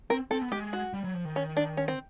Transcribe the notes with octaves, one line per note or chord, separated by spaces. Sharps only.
C4 A#4
C4 A4
B3
G#3 G4
F#4
G3
F#3
F3
D#3
C#4
D4
C#4
C4